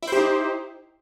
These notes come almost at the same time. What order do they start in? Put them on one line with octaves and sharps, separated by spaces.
E4 C5 G4 D#4